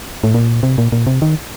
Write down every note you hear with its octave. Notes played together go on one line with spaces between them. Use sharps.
A2
A#2
C3
A#2
A#2
C3
D#3